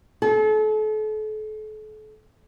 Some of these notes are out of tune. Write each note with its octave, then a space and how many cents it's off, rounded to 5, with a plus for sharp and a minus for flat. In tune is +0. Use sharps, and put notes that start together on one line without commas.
A4 -40